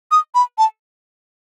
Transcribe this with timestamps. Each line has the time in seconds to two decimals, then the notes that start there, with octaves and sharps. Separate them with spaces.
0.11 D#6
0.35 B5
0.58 A5